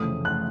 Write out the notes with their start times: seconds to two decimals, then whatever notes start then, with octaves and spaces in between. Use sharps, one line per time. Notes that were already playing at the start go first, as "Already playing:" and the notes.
Already playing: F1 F2 C#3 E3 A3 D#6
0.25 F#6